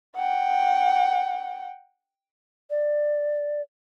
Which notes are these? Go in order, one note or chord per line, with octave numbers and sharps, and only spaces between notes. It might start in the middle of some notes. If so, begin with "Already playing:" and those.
F#5 G5
D5